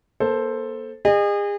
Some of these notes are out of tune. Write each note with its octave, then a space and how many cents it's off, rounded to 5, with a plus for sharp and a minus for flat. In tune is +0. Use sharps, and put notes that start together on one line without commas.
A#3 +30 A4 +0 C5 +5
G#4 -35 D#5 -35